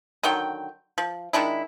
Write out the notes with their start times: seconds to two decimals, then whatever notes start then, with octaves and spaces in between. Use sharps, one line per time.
0.23 D3 D#3 F#3 G5
0.98 F3
1.33 D#3 G#3 D4 E4